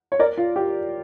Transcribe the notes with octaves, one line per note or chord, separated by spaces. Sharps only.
C#5
A#4 D5
F4
G4